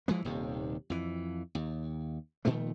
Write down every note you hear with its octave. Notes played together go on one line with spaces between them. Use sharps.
E3 F3 G#3 A#3
D#1 D#2 C3
F2 E3
D#2
A#2 D#3 F3 A3